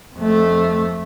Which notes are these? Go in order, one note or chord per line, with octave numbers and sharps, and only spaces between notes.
F2 A3